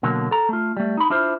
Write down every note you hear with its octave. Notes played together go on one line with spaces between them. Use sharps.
B2 D3 F#3 A#3
A4 A#5
A3 F4
G3 A3
D#4 B5
D4 E4 F4 C5